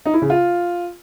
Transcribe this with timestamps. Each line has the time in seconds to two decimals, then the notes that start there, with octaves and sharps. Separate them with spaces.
0.06 D#4
0.14 E4
0.22 C#3
0.30 F4